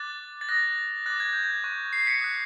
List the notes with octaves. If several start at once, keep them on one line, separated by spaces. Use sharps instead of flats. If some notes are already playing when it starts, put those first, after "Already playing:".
Already playing: D6 F#6 A6
A6
D#6 F#6 A#6
D6 F#6 A6
G#6
G6
G#6
C#6 F#6
C7
B6 C#7
D#6 F#6